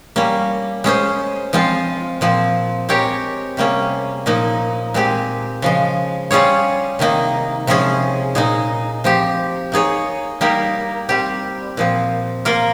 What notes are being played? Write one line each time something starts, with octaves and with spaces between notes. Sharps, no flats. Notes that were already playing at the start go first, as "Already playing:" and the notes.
G3 A#3 C#4
G#3 C#4 G#4 C5
F3 G#3 C4 F4
A#2 F3 C4
G#3 C4 G4 A#4 C#5
C3 G3 A#3 C#4 G#4
A#2 F3 A#3 D#4
A#2 G#3 C4 G4
C#3 F3 G#3
G3 C#4 F4 G#4 C#5
C3 D#3 A#3 D#4
C3 F3 G#3 C#4 G#4
A#2 G#3 D#4 G#4
F3 C4 G4
A#3 D#4 G#4 C#5
G3 A#3 D#4 G4 A#4
G3 C4 G4
A#2 F3 C4
A#3 F4 A#4